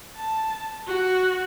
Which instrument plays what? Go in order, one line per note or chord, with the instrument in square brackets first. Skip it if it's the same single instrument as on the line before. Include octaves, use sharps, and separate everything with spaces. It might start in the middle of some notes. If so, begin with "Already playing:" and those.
[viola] A5
F#4